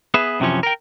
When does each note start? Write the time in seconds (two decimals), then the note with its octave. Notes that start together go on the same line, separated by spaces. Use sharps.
0.14 B3 G#4 B4 E5
0.40 F#2 C3 E3 F3 C#4
0.63 A#4 G5